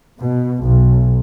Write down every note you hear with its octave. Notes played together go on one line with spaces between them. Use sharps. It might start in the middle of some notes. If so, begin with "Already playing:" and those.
B2
B1